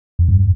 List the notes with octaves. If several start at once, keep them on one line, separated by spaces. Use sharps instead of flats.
F2
G2